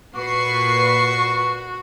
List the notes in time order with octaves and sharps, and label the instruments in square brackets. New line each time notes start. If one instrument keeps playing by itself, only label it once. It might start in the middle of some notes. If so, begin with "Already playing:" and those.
[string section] A#2 B4 C7 [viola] F#4 [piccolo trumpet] C#6